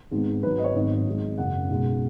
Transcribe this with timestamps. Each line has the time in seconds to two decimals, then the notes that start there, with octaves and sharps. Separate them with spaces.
0.11 G#1 G#2 G#3 B3
0.43 G#1 G#2 F#3 B4
0.58 D#5
0.64 C#5
0.74 G#1 G#2 D#3 F#3 B3 D#5
1.06 G#1 G#2 G#3
1.38 F#1 F#2 C#3 F#5
1.69 B1 B2 G#3